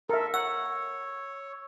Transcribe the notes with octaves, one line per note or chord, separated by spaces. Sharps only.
A4 A#4 E5
C#5 F#5 E6